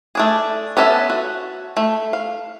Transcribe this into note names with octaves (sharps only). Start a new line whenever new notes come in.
A3 D4 G#4
B3 C#4 A4 D#5 E5
F#4
A3
F5